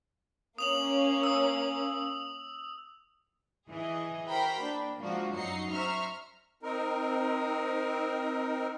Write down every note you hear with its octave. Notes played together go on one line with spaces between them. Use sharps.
A#3 C#4 D#6 F7 F#7
D#6 E6
E3 G#4 D#5
F#4 A#4 C5 G5 B5
A#3 D4
F3 G#3 A#3 D4 F#4
F#2 F#3 D#4 F#4 C7 C#7
C5 E5 A#5 C#6 F6
C4 D#4 A#4